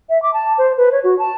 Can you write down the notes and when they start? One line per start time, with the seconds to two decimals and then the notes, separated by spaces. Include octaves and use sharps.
0.09 E5
0.22 D6
0.34 A5
0.58 C5
0.77 B4
0.92 C#5
1.04 F#4
1.19 A5